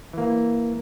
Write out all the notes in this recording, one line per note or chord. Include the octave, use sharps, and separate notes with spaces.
E3 A#3